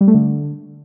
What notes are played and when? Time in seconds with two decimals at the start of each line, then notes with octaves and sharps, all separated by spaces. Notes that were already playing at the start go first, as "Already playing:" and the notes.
0.01 G3
0.07 A3
0.14 D3